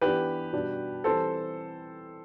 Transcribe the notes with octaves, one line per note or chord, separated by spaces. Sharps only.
E3 B3 D4 G4 B4
B2 G3 D4
E3 G3 C4 A4 C5